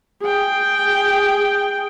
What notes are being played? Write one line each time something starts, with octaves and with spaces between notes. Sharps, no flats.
G#4 G5